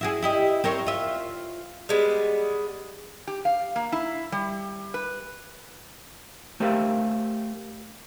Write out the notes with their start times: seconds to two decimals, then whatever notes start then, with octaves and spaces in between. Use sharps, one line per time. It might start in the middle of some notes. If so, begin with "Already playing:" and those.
0.01 E4 F#4 G#4
0.23 E4 G4 D#5
0.64 C4 A#4 C#5
0.87 F4 E5
1.89 G3 G#3 B3
3.27 G4
3.45 F5
3.76 A#3
3.92 E4
4.32 G3
4.94 B4
6.60 A3 G4 A#4 C5 E5 F5